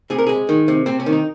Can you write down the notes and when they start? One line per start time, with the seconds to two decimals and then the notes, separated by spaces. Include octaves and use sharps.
0.10 C3 G#4
0.18 A#4
0.27 G#3 G#4
0.49 D#3
0.68 C3
0.86 C3 C4
1.00 C#4
1.06 D#3
1.13 D#4